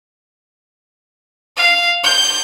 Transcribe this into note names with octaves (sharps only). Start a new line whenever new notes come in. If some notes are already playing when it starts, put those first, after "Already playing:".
F5
G6